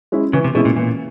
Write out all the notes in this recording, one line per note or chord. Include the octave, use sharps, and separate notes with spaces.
G#3 C#4 E4
C#3 E3
C3
B2 G#3 C#4 E4
A#2
A#2 E3